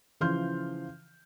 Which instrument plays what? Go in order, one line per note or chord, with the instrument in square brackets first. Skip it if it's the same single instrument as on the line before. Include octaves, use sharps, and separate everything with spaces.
[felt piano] C#3 E3 F3 C6 F6 G6